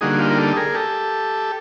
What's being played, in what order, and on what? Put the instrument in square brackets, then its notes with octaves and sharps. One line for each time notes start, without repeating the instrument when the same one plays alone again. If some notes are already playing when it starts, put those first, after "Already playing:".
[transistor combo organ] D3 G3 A#3 D#4 F#4 G#4
F4 G4
A#4
G4 A4
G#4 A#4
G4 A4